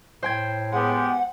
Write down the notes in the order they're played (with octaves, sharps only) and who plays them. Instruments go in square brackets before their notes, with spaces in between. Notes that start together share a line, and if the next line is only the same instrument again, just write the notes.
[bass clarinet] A2 [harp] C5 G5 G#6
[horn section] G#3 B3 G4 [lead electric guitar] F#5